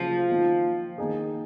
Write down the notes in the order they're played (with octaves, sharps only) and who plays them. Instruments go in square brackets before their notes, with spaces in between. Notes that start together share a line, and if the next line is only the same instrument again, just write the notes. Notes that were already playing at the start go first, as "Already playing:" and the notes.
Already playing: [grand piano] C#3 F#3 A#3 F4 G#4 [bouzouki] F3
[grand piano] D#3 A#3 F4
D#3 A#3 D#4 G#4